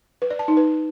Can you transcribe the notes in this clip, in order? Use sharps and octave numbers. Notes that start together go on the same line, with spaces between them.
B4
D5
A5
D#4
B4